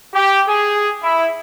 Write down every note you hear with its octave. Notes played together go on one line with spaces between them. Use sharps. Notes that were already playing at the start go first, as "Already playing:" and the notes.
G4
G#4
E4